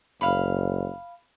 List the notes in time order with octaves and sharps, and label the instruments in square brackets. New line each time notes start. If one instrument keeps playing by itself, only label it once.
[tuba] F#1 [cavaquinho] F5 B5